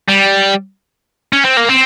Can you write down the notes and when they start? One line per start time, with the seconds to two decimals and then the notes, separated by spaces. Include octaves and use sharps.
0.08 G3
1.33 C#4
1.45 C4
1.57 A#3
1.69 C4